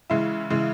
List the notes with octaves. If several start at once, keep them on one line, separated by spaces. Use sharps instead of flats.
C#3 E3 G#3 E4
C#3 E3 G#3